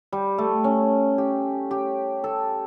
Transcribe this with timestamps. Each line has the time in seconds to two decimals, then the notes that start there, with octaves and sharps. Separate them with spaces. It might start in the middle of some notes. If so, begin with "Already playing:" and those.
0.12 G3
0.38 A3
0.64 C#4
1.18 G4
1.71 G4
2.24 A4